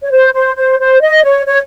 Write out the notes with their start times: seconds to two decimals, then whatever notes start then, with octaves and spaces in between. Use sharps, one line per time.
0.02 C#5
0.11 C5
0.34 C5
0.56 C5
0.80 C5
1.01 D#5
1.24 C#5
1.46 C#5